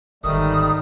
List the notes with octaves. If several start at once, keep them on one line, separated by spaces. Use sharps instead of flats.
G1 G#2 D#3 G3 A3 D#6